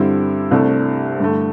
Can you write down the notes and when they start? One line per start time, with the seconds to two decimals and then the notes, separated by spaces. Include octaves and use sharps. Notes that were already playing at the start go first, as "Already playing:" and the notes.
Already playing: G2 D3 G3 C4 E4
0.51 C2 C3 A3 D4
1.20 G2 D3 A3